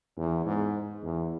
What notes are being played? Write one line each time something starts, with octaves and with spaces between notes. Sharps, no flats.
E2
G#2
E2